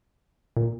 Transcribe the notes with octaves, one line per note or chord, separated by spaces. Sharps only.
A#2